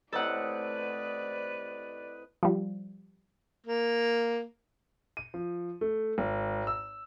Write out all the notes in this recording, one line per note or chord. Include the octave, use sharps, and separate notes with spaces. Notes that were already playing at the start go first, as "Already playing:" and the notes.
A2 C3 D#4 A4 B4 D5 F#5
F3 G3
A#3
D#7
F3
A3
G#1
E6